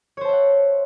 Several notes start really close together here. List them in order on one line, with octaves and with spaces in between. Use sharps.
C#5 C5 A5 E5 F#5